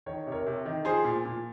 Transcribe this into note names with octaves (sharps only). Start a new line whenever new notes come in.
D#3 C#5
C3
A#4 C#5
C3
D#3
F3 G#4 C5
A#2
A#2